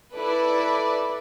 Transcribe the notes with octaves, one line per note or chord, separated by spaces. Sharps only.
E4 A4 B4 D5